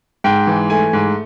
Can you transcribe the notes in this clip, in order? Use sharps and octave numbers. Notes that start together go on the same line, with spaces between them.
G#2 G5
E3
A3 G#5
G#2